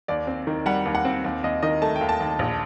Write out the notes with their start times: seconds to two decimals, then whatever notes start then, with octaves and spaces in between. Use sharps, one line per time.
0.08 D#2 D5
0.27 C4
0.47 D#3
0.66 G3 F#5
0.85 D#2
0.95 F#5
1.05 C4
1.25 D#2
1.44 D#2 D#5
1.63 D#3 D#5
1.82 A3 A5
1.96 G5
2.01 D#2
2.09 A5
2.20 D#2
2.39 A#1